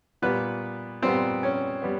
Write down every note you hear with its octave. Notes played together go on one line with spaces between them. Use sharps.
A#2 G3 B3 B4
A#2 G3 B3 C4 C5
C#4 C#5
G3 B3